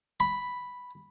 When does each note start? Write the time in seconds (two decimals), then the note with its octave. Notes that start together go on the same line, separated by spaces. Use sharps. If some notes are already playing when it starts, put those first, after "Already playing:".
0.20 B5